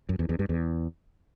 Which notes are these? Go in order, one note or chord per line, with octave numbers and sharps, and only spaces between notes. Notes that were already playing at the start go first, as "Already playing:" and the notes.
F#2
E2
E2
G2
E2